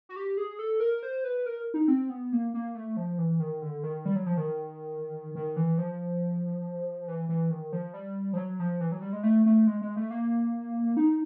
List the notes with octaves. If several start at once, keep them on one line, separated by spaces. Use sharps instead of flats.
F#4
G4
G#4
A4
A#4
C5
B4
A#4
D#4
C4
B3
A#3
A#3
A3
F3
E3
D#3
D3
D#3
G3
F#3
F3
D#3
D#3
E3
F3
E3
E3
D#3
F3
G3
F3
F#3
F3
E3
F#3
G3
G#3
A3
A3
G#3
G#3
A3
A#3
D#4